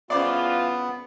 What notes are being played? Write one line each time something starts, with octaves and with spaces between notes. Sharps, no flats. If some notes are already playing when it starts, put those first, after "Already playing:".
G2 C#3 E3 B3 F4 C5 D5